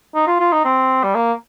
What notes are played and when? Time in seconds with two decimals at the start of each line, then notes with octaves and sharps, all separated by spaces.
0.15 D#4
0.27 F4
0.40 F4
0.52 D#4
0.65 C4
1.03 G3
1.15 A#3